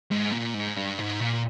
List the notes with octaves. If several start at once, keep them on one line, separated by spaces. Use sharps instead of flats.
G#2
A#2
G#2
G2
G#2
A#2